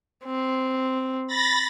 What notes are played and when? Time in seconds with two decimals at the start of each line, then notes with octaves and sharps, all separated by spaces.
0.25 C4
1.27 B5 A6 A#6